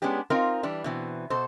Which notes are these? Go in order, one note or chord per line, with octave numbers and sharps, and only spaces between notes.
G#3 B3 C#4 D4 G4
C4 D#4 F4 A#4 F5
E3 G3 D4
B2 E3 C4
B2 A4 C5